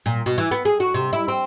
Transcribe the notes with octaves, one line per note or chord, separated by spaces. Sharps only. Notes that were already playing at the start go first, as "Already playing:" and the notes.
A#2
B2
E3
B3
G#4
F#4
C3
E4
C4